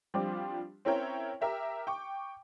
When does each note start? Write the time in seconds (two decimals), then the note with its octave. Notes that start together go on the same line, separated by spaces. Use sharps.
0.14 F3 G3 C4 D4 F4 G4
0.85 C4 C#4 E4 A#4 C#5 G5
1.41 G4 A#4 E5 G5
1.87 G5 C#6 D6